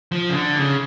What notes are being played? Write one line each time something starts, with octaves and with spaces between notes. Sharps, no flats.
F3
C#3
D3
C#3